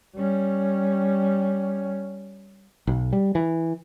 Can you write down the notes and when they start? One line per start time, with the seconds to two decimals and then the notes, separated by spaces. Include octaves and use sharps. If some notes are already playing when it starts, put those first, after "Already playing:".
0.16 G3 C#4
2.87 B1
3.13 G3
3.35 E3